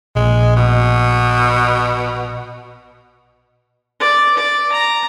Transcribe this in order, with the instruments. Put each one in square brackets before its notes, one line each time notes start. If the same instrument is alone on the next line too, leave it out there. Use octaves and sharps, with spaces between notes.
[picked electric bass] A#1 [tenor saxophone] G#3
[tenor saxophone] B2
[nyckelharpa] D5
D5
A#5